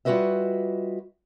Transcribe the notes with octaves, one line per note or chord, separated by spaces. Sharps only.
G3 F4 F#4 B4 D#5 E5